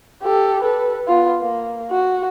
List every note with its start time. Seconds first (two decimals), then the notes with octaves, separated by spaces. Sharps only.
0.22 G4 A4
0.62 A4 B4
1.08 B3 F4
1.40 A#3
1.91 F#4